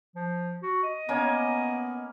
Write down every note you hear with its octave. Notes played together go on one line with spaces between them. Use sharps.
F3
F#4
D#5
A#3 B3 C#4